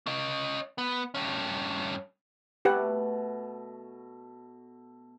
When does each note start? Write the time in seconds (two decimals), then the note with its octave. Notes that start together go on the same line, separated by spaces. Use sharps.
0.06 C#4 D#5
0.78 B3
1.14 G2 C#4
2.65 B2 A3 G4 B4 F#5